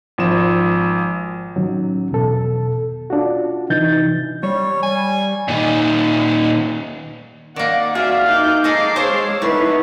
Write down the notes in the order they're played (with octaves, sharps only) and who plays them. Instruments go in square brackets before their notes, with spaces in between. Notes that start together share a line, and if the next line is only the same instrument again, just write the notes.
[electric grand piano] G#1 F3 E7
[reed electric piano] A2 D#3 F#3 C#4
E2 B2 A4
D4 F4 F#4
C3 E3 D#4 G6 A6
[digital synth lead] G3 [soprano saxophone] C#5
[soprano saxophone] G#5
[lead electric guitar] A#2 D#3
[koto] D#3 A#3 [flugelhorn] D5 [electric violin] F#5
[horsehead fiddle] F#4 [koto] G#4 [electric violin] D5 E5 [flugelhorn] F5
[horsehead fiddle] D#4 [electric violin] D6 G6
[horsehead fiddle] G#3 [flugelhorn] D#4 [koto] G#4 A4 D#5 [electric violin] D6 C7
[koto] F4 C5 A5 [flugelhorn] C#5
[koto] A3 [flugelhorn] B3 [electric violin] D#4 [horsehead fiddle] E4 B4